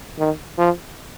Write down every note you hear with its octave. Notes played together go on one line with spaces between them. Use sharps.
D#3
F3